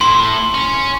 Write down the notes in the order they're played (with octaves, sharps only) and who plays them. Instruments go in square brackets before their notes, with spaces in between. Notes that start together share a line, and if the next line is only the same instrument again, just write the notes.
[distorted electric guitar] A2 E4 [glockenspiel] C6
[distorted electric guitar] C#4